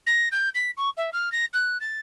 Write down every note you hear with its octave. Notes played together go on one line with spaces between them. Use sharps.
A#6
G6
B6
C#6
E5
F6
A#6
F#6
A6